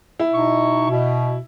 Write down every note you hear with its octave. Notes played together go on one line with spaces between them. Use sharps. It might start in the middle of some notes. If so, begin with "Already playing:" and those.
E4
B2 D#4 C#6
B2